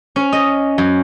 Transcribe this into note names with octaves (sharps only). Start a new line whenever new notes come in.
C#4
D#5
F#2